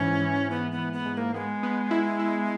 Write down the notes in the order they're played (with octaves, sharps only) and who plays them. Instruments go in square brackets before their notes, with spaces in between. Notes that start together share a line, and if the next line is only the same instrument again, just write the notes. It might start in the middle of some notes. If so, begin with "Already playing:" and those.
Already playing: [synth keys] G#2 E3 [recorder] C#4
[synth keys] E3
[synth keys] E3 [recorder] B3
[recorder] B3
[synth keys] E3
[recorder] B3
[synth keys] G#2
[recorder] B3
A#3
[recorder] G#3 [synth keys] B3
[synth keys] B3
E4
E4